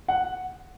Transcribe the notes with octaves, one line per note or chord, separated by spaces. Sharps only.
F#5